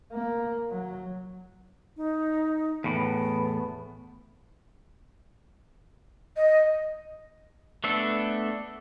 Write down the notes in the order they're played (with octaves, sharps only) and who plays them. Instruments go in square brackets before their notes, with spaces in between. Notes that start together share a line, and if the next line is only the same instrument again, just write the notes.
[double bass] A#3
F#3
[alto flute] D#4
[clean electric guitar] E2 A2 [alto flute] B3
[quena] D#5
[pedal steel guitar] A3 B3 D4 A4